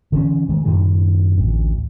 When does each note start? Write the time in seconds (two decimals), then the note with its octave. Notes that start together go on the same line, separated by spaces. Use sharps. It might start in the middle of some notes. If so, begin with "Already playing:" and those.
0.12 D3 E3 C#4
0.49 D#3 G#3 A3
0.65 F#2 A2 D#3 G3
1.37 A1 D2